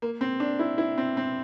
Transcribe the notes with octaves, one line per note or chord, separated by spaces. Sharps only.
A#3
C4
D4
E4
E4
C4
C4